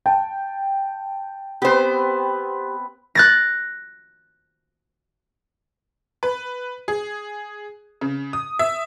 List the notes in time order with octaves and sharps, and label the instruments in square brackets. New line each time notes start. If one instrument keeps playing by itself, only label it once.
[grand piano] G5 A5
[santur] B3 C4 B4 [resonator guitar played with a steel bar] G4 C5
[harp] F#6 A6 A#6
[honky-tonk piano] B4
G#4
C#3
D#6
E5